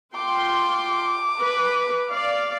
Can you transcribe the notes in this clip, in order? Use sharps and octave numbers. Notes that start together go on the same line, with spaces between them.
F4 G5 C6 D6
B4
D5 F5